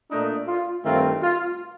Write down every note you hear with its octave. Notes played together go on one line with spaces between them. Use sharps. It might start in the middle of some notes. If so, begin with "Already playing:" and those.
A#2 A3 D4 D#4
F4
G2 D#3 A3 C4 F4
F4